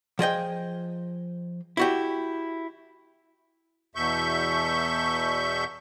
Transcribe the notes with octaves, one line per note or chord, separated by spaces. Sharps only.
F3 G#4 D#5 G5
E4 F#4 G4
E2 B2 E5 C#6 G6